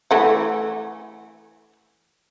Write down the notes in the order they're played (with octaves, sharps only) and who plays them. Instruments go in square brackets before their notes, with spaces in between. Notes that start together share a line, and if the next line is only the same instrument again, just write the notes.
[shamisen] E3 A3 F#5